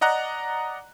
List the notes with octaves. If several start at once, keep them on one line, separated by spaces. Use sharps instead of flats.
D5 D#5 F#5 A#5 F#6